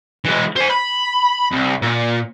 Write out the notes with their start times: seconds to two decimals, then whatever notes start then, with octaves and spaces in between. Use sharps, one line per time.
0.25 E3 G#3
0.56 C5 G#5
0.70 B5
1.52 C2
1.82 A#2